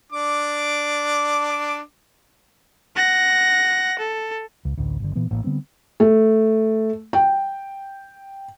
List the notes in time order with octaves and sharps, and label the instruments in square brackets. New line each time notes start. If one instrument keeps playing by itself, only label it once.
[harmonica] D4 D6
[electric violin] F#5 A#6
A4
[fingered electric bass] C#2
A1 D2
G1 D3
A#2 E3 A#3 B3
A1 A2 A#3
D3 G3 B3 C4
[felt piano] A3
G5